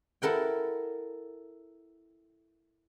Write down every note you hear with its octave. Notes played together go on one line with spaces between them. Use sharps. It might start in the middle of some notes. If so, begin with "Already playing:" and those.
E4 A4 A#4 F#5 G5